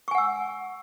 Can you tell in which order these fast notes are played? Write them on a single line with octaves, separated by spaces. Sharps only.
C#6 G#5 F#5 E6